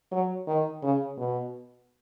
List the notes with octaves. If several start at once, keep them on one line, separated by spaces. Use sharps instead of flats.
F#3
D#3
C#3
B2